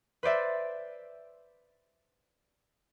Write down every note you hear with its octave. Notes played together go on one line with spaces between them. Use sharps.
B4 C5 D5 E5